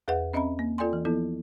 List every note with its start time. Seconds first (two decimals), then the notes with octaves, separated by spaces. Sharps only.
0.08 E2 G#4 B4 E5 F#5
0.33 C4 C#4 D#5 E5 A#5 B5
0.59 A#3
0.78 F4 A4 D5 G5 G#5 C6
0.93 E3
1.05 F3 B3 E4 A4